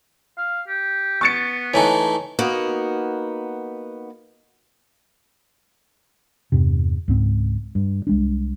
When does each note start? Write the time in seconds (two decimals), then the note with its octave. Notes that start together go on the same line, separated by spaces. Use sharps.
0.38 F5
0.68 G4
1.21 B3 C#6 A6 C#7
1.74 E3 A3 D#4 C#5 G#5
2.39 A#3 B3 D#4 F#4
6.52 E2 G2 C3
7.08 C#2 G#2 C4
7.75 G2
8.07 C2 G#3 D4